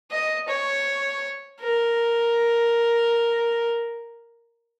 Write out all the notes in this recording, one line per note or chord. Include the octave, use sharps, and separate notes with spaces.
D#5
C#5
A#4